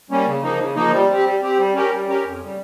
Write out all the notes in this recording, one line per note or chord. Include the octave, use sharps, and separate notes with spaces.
G3 A#3 C#4
C#3
F3 A#3 D#4
C#3
F3 A#3 D#4
G3
C4 G4
G3
C4 G4
G3
C#4 G4 A#4
G3
C#4 G4 A#4
F2
C#3 G3